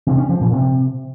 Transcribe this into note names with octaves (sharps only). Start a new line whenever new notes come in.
C3
C#4
F3
A#2
C3